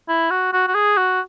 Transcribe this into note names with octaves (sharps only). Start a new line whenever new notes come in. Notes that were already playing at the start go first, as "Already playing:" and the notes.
E4
F#4
F#4
F#4
G#4
F#4